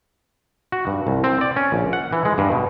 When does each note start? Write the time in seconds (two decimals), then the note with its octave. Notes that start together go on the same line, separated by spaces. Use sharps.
0.72 F#4
0.87 G2
1.07 C2
1.24 C4
1.41 D5
1.56 C#4
1.72 A#1
1.93 F#5
2.13 E3
2.25 G#3
2.38 G2
2.52 B2